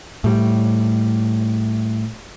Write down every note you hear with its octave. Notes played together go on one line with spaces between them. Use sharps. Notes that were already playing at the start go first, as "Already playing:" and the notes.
A2 G3